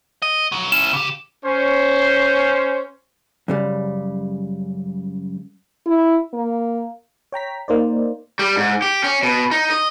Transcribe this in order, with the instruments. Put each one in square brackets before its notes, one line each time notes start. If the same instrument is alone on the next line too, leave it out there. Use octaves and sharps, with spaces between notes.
[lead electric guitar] D#5
B1 F#3
[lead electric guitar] C#4 E4 [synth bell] E7
[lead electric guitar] C#3 G4
[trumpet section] C#4 C5
[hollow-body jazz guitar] F#2 C#3 G3
[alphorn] E4
A#3
[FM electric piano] C#5 G5 A#5 B6
A#3 D#4 C5 D5
[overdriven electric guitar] G3
G#2
G4
C#4
B2
D#4
D#5